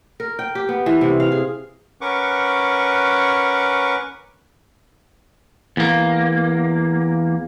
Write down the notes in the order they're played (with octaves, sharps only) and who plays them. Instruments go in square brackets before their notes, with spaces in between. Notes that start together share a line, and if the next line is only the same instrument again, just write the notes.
[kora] A#4
G5
G4
B3
E3
C3
F5
G#4
[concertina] C#4 A#4 B4 F#5 C#6 D6
[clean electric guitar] E2 A#3